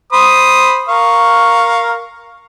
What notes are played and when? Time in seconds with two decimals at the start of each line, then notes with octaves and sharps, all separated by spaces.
0.13 C5 B5 D#6
0.88 A#4 F5 C#6